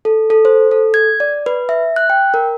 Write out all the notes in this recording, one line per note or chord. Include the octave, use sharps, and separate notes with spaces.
A4
A4
C5
A4
G#6
D5
B4
E5
F#6
G5
A#4